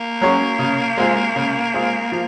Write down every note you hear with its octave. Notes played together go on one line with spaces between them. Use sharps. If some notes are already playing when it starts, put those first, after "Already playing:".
Already playing: A#3
F#3 C#4 G#4 C#5
C#3
G#3 C4 F4 G#4
C#3
G#3 C4 F4 G#4
F3 A#3